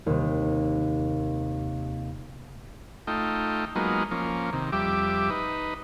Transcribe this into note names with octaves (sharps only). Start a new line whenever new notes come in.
D#2 C3
A3 D#4 F4 G5
F#3 G#3 A#3 B3 D#4 F4
F3 A#3 C#4
C3 D#3
F2 G3 G4 E5 D6
D#4 B4